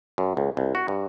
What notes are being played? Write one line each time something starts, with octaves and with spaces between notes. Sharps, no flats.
F#2
C#2
C2
F#4
G2